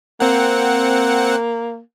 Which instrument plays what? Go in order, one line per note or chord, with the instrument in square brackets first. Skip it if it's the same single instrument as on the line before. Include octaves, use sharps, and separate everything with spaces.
[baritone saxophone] A#3 [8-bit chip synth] C4 F#5